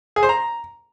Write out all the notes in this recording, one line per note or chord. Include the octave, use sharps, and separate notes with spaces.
G#4
C5
A#5